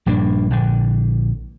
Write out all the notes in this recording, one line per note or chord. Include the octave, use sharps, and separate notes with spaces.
A#1 G2 A#3 D4
A#1 D3